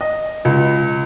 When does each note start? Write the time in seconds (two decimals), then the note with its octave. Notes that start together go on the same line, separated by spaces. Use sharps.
0.01 D#5
0.45 C#2